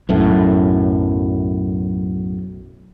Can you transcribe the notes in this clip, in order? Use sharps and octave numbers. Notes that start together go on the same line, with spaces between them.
B1 F#2 A2